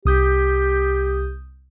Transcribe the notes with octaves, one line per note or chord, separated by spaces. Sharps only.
C2 G4 D#6 G6